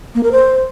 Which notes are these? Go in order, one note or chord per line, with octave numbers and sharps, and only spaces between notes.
A#3
A#4
C5